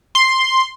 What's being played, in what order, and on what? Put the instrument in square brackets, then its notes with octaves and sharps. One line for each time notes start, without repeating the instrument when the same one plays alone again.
[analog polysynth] C6